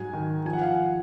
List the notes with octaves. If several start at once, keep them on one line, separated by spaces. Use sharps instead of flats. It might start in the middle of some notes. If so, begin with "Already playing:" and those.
Already playing: G#2 F#3 G#5
D#3
F3 G#5
F#5
F5
F#5